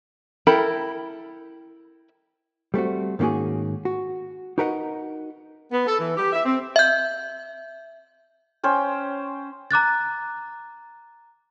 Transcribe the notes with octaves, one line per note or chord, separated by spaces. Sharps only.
E4 A4 A#4 G5 B5
G3 A3 C4 F#4
G#2 D#3 A#3 C#4 F#4 G#4
F#4
D#4 F#4 A#4 B4 D#5 F#5
B3
A4
E3
G4
E5
C4
E5 G6
C#4 C5 G5
A#5 D6 F#6 A6